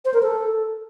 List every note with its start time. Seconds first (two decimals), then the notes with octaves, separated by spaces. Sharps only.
0.05 C5
0.14 A#4
0.23 A4